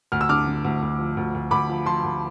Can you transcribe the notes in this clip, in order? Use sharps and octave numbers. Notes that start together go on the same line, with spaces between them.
D2 F6
E6
D3 D6 F6
D3
D2
D2
F3
D2
D2
D2 B5 D6
F3
F3 A5 C6
D2